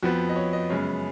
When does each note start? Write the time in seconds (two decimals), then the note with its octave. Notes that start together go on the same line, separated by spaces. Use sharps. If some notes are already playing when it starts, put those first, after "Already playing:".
0.03 F2 F3 B3 F#4
0.29 D#5
0.36 C#5
0.53 D#5
0.70 F#2 C#3 G#3 B3 C#5